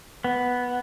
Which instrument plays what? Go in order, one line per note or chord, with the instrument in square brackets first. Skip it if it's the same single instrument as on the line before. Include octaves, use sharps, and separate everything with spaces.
[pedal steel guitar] B3